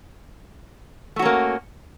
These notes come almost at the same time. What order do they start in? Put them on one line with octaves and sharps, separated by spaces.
A3 F#4 C#4 A#3